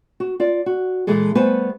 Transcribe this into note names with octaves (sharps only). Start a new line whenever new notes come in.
F#4
F4 D5
F#4
A#2 E3 G#3 G#4 A4
G3 A3 B3 B4 C5 G#5